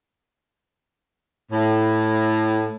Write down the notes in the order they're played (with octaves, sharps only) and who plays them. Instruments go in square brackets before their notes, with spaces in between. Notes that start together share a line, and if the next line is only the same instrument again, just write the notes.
[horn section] A2